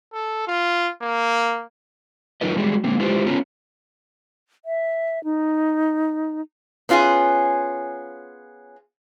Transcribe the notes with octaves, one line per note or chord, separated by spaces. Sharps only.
A4
F4
A#3
F#3 D#4 F4 A#4 B4 D#5
G3 G#3 F#4 G#4
D3 G#3 A#3 C4
G#3 E4 F4 G4 B4 C5
B3 C#4 F4 A#5
E5
D#4
B3 C#4 F4 G4 G#4